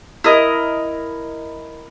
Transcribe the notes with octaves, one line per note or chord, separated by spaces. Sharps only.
E4 A#4 D#5